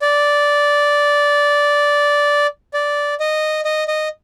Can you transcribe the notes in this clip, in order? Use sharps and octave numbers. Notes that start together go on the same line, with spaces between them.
D5
D5
D#5
D#5
D#5